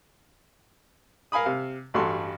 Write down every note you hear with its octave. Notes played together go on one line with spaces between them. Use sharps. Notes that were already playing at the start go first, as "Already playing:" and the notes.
A#4 F5 G#5 B5 D#6
C3 F5
A1 G2 F#4 A4 C6